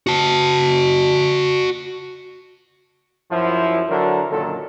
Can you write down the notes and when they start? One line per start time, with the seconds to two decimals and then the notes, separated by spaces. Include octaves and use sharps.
0.07 F#4 A5
3.31 F#2 F3 E4
3.89 D3 F#3 A#4
4.31 F#2 A#2 D3 D#3 F#3 A4